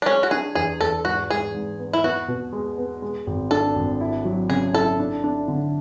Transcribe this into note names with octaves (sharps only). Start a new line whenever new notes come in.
D4
G#3 C#4
F#4
D4 G#4
E2 G#4
E2 A4
G#2 F#4
G#2 G#4
G#2
B3
E4
B3 F#4
B2
G#3
B3
G#3
G#1
D4 A4
G#1
E4
F#3
C#3 G#4
E4 A4
D4
D4
D3